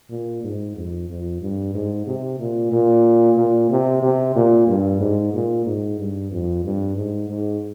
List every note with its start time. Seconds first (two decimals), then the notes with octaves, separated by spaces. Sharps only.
0.10 A#2
0.43 G#2
0.76 F2
1.09 F2
1.42 G2
1.74 G#2
2.07 C3
2.40 A#2
2.72 A#2
3.37 A#2
3.70 C3
4.02 C3
4.36 A#2
4.68 G2
5.00 G#2
5.33 A#2
5.66 G#2
5.99 G2
6.31 F2
6.64 G2
6.96 G#2
7.29 G#2